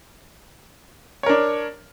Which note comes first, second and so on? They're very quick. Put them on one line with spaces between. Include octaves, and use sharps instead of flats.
C#5 A#4 D4